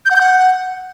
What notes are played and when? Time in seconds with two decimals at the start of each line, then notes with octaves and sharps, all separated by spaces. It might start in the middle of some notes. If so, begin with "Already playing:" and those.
0.05 G6
0.11 F#5
0.16 G6
0.21 F#5